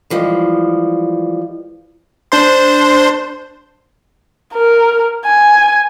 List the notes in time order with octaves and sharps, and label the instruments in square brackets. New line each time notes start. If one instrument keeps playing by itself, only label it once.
[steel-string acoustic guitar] E3 F3 G3 G#3
[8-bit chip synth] D4 C5 C6
[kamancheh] A#4
G#5